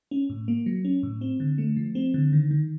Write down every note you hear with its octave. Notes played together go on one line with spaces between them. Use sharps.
C#4
A2
A#3
F#3
C#4
A2
C4
D3
A3
F3
C4
D3
D#3
D#3